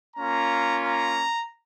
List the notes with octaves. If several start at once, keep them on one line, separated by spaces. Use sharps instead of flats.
A#3 C#4 F4 A#5
A#5